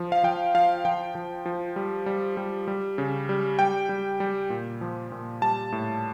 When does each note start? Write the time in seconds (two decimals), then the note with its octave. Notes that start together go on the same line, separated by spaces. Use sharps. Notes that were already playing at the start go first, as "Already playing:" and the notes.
Already playing: F3
0.12 F5
0.23 F3 G5
0.54 F3 F5
0.85 F3 G5
1.15 F3
1.46 F3
1.76 G3
2.06 G3
2.37 G3
2.68 G3
2.98 C#3
3.29 G3
3.59 G3 G5
3.89 G3
4.20 G3
4.50 A#2
4.81 F3
5.12 A#2
5.42 G3 A5
5.72 A2